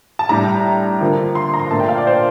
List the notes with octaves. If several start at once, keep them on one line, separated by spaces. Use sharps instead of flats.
A5
A2 G3 D4 A#5
D3 F3 A#3
C6
A#5
C6
A#2 F3 A3 D4 A5
G5
F5
D5
C5